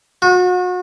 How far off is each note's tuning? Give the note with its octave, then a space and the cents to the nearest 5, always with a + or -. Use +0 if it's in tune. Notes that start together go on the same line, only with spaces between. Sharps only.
F#4 -35